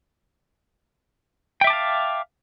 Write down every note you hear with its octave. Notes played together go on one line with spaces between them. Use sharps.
E5 F5 G5 A5 D6